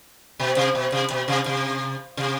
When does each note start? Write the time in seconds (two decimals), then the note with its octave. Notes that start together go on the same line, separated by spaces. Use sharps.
0.40 B2
0.57 C3
0.75 B2
0.92 C3
1.10 B2
1.28 C3
1.46 C3
2.17 C3